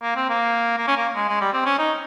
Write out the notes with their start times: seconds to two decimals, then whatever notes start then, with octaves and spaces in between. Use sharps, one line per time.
0.02 A#3
0.16 C4
0.29 A#3
0.78 A#3
0.88 C#4
0.97 A#3
1.15 G#3
1.29 G#3
1.41 G3
1.53 C4
1.65 C#4
1.79 D#4